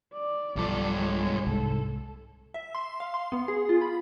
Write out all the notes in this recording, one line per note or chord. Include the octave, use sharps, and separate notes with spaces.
D5
B1 G2 F3 A4
G#3 C#5
C2 G#2 A4
E5
C6
F5
C6
B3
G#4
F4
B5